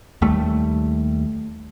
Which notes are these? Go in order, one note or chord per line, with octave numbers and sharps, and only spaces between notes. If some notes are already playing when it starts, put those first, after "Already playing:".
D#2 G3 A3